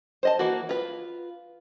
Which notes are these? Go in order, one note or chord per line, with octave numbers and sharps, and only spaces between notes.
C5 D#5 A5
E3 A#3 F#4
F4 B4